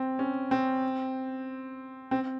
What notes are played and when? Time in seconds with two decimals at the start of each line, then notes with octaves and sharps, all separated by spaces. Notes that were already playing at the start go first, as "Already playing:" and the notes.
Already playing: C4
0.19 C#4
0.51 C4
2.11 C4